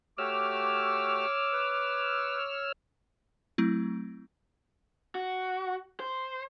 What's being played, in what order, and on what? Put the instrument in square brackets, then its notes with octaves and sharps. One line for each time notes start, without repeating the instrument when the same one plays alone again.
[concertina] A3 F#4 G4 [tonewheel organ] C#5 E6 F6 [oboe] D6
[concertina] B4
[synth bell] F#3 A3 C4 E4
[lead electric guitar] F#4
C5